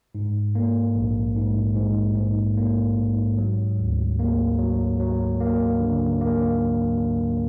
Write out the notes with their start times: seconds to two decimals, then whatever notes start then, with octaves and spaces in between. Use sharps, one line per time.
0.15 G#2
0.55 A#3
0.95 A#1
1.36 G#2
1.76 G#2
2.16 G#2
2.57 A#3
2.97 G#2
3.38 F#3
3.78 D2
4.19 A#3
4.59 F#3
5.00 F#3
5.40 A#3
5.80 D3
6.21 A#3